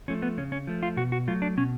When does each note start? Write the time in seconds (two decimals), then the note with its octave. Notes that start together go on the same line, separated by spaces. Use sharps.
0.08 F3 A3 C#4
0.22 B3
0.37 C#3 C#4
0.52 C#4
0.67 F3 A3
0.83 F4
0.97 B2 F#4
1.12 F#4
1.27 F#3 A3 F4
1.42 D4
1.57 B2 C#4